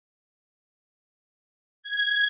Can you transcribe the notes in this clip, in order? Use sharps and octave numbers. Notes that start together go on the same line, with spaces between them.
G#6